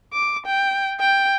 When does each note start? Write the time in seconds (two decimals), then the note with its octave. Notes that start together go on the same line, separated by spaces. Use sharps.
0.13 D6
0.46 G5
1.00 G5